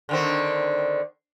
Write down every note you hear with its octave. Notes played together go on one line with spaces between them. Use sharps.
D3 D#3 C4